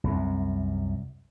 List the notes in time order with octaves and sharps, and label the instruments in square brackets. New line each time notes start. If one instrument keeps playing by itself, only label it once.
[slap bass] C2 F#2